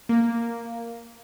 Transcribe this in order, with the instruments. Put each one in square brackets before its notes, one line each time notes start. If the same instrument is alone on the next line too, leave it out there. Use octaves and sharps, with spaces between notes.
[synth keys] A#3